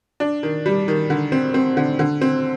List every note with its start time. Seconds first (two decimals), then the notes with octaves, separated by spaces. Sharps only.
0.20 D4
0.43 D#3
0.66 G3
0.88 D#3
1.10 D3
1.32 C4
1.54 C4
1.77 D3
1.99 D3
2.21 C4